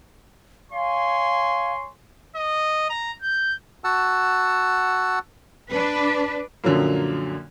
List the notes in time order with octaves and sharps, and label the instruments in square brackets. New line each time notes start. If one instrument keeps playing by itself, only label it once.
[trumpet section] C#5 G#5 C6 [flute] F5
[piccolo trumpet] D#5
A#5
G6
[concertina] F#4 F#5 A5 E6
[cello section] D4 B4
[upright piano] F#2 A#2 D3 F3 F#3 A#3